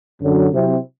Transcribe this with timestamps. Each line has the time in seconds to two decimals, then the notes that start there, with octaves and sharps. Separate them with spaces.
0.21 F#2 D3 F#3
0.52 C3 F#3 C4 E4